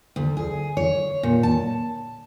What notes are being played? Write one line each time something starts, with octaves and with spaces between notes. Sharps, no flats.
D2
G#4
C#5
A#2
A5